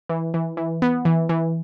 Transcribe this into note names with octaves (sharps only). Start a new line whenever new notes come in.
E3
E3
E3
B3
E3
E3